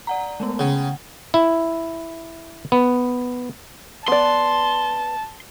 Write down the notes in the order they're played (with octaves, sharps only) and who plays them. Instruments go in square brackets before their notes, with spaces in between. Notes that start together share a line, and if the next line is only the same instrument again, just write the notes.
[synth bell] D5 F#5 A#5
G#3 A3 B3
[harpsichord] C#3 [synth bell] F#5 G5
[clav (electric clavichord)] E4
B3
[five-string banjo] B3 D5 [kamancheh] A5 [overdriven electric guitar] C6